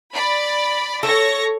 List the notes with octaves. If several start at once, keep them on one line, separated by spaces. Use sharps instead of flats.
D5 B5
A4 C#5 C#6 A#6